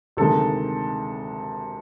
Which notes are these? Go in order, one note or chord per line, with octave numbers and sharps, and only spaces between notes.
D2 C3 D#3 G#3 A4